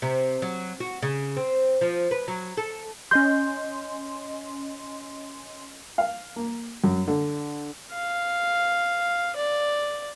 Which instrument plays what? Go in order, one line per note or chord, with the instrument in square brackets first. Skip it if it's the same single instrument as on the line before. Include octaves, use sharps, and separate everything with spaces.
[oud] C3
F#3
F#4
C#3
C4
F3
B4
F#3
A4
[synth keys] C#4 D#5 C6 [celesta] G6
[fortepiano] F5
A#3
F#2
D3
[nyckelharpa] F5
D5